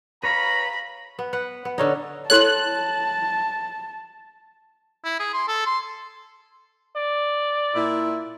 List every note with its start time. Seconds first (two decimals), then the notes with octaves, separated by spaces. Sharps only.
0.23 B4 C#5 F5 A#5 B5 A#6
1.19 B3
1.33 B4 F#5
1.65 B3
1.78 D3 C#4 D#4
2.30 E4 A4 C#5 A5 F#6
5.04 E4
5.19 G#4
5.33 C6
5.48 A4
5.66 C6
6.96 D5
7.75 A#2 E4